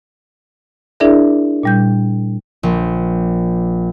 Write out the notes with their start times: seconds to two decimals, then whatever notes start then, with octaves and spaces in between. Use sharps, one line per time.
1.00 D4 E4 G#4 A#4 D5 E5
1.63 A#2 G3 G6
2.63 A#1